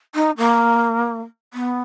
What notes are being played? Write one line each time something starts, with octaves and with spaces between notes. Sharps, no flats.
D#4
A#3
B3